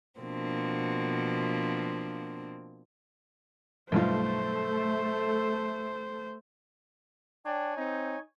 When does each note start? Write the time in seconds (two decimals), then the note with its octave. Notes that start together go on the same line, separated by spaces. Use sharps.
0.21 B2 F3 A#3 C4 D4
3.92 B1 G2 A3 F4 C5
7.45 D4 C#5 G5 G#5
7.77 C4 D#4